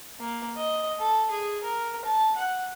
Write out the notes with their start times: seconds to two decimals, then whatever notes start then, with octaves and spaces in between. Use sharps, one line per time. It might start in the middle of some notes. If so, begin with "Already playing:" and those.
0.20 A#3
0.57 D#5
0.99 A4
1.31 G#4
1.63 A#4
2.05 A5
2.36 F#5